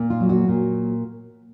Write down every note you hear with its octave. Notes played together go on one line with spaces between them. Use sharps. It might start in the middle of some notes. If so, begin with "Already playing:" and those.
Already playing: A#2 A#3
F4
F#3
F#4
A#2